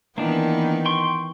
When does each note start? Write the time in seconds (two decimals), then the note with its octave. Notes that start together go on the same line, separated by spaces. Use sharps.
0.18 D#3 E3 A#3 B3 D4
0.85 G5 C6 C#6